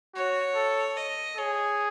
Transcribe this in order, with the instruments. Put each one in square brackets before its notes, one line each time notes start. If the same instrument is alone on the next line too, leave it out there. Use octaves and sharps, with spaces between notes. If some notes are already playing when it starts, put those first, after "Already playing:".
[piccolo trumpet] F#4 [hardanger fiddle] C#5
[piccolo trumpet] A4
[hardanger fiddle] D#5
[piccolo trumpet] G#4 [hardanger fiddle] C#5